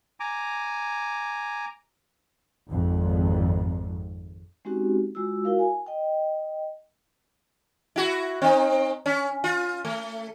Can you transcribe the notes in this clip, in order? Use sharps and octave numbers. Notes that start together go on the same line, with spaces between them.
G#5 A#5 D6
G#1 F2
G#3 C4 C#4 D#4 F#4 G4
G#3 F4 F#4 E6
E4 F#4 A#4 F5
G#5
D#5 G5
E4 F#4
C4 D#4
C#4
F4
A3